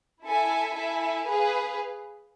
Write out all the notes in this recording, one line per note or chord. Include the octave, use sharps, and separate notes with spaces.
E4 A4 E5 G#5
E4 A4 E5 G#5
G#4 B4 F5